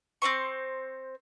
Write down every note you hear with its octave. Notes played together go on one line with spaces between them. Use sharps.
C4 C#4 C5 C#6